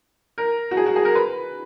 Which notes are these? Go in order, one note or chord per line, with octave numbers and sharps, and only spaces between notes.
A#4
F#4
G#4
F#4
G#4
A#4
B4